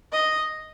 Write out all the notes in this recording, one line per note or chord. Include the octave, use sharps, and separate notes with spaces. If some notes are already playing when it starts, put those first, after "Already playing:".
D#5